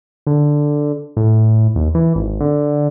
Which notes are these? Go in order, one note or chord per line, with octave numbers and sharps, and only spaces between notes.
D3
A2
D#2
E3
G#1
D3